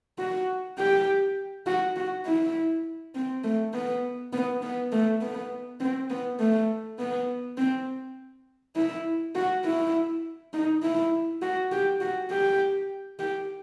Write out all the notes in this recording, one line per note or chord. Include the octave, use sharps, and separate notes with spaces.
F#4
G4
F#4
F#4
E4
C4
A3
B3
B3
B3
A3
B3
C4
B3
A3
B3
C4
E4
F#4
E4
D#4
E4
F#4
G4
F#4
G4
G4